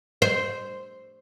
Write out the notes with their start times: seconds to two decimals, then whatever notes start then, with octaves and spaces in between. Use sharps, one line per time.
0.22 C5